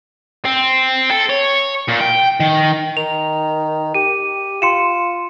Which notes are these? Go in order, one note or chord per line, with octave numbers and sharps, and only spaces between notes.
C4
A4
C#5
A#2
G5
D#3
D#3 F7
G4 D#7
F4 C6 C#7 E7